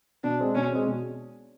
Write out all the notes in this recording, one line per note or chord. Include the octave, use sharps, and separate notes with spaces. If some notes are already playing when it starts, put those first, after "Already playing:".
B2 D4
G#3 C4
B2 C#4
G#3 C4
B2